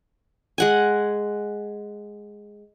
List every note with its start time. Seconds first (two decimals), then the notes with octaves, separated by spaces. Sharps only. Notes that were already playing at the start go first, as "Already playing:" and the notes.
0.58 G#3 F#5 G#5